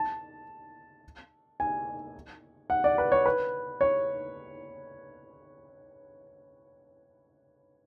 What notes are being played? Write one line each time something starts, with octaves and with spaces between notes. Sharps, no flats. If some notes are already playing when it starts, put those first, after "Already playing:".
Already playing: A5
G#5
F#5
D5
B4
C#5
B4
C#5